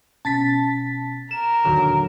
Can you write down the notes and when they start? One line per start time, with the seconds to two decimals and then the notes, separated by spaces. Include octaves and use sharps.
0.25 B2 C#4 A5 A6 B6
1.31 A#4 E7
1.65 D#2 A#2 D3 D#3 F#3